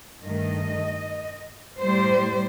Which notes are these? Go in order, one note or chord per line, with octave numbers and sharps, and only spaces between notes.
G2 D#3 A3 D#5
A2 G3 C5